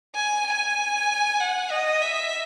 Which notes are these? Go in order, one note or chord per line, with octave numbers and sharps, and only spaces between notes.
G#5
G#5
F#5
D#5
E5